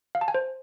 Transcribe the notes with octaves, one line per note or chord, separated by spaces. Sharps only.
F5
A5
G#5
C5